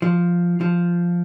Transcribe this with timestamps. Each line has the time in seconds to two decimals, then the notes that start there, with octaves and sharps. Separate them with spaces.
0.02 F3
0.61 F3